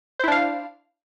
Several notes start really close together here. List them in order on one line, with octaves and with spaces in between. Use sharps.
C5 E4 D4 F5